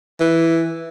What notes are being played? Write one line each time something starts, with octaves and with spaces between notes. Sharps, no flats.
E3